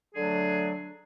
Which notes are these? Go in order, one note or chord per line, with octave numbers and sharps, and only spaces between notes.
D3 F#3 A3 D4 G#4